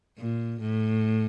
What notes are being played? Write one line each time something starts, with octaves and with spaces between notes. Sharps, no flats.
A#2
A2